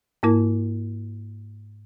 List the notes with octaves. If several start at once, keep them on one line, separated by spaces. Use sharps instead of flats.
G#2 A#3 E4 A#4